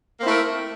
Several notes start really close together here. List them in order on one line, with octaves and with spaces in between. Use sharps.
A#3 C4 E4 A3 A#4